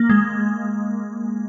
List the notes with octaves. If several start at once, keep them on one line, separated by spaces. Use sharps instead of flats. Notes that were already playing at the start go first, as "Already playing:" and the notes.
Already playing: A#3
G#3